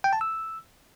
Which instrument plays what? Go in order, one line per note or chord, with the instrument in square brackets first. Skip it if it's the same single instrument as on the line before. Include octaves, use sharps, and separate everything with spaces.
[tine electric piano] G5
A5
E6